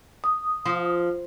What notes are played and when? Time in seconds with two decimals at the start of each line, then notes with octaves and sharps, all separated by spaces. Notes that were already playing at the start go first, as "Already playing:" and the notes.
0.24 D#6
0.65 F3